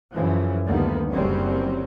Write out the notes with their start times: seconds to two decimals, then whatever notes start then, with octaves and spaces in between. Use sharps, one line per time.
0.14 F#2 C#3 E3 F3
0.66 D2 D3 D#3 G3 A#3 B3
1.11 F#1 F#2 F#3 G3 C4 C#4